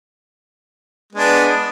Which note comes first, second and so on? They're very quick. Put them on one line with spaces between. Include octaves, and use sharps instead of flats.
G#3 B3 D4